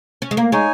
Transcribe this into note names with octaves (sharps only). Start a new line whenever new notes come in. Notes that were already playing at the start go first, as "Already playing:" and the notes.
C#4
G#3
A#3
G#3 D#4 C#5 G#5